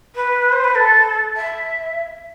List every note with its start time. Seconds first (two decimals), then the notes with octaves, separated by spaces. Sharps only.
0.15 B4
0.52 C5
0.64 B4
0.74 A4
1.36 E5